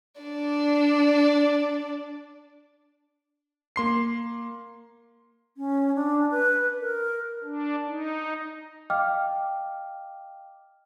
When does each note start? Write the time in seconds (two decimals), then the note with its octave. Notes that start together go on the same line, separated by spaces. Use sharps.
0.21 D4 D5
3.76 A#3 C6 C7
5.57 C#4
5.95 D4
6.31 B4
6.81 A#4
7.43 D4
7.88 D#4
8.90 D#5 F5 G5 D6 F6